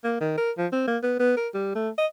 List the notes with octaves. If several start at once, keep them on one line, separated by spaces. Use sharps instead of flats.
A#3
D#3
A#4
F3
C4
A#3
B3
B3
A#4
G3
A3
D#5